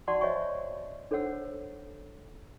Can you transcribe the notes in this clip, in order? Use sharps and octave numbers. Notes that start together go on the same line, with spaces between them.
F#4 D5 F#5 A5 C6 C#6
C5 C#5 D#5 E5 G#5 C#6
D4 A4 C5 C#5 F#5 E6